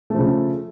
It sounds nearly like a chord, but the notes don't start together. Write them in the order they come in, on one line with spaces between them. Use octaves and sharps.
A3 F3 C#3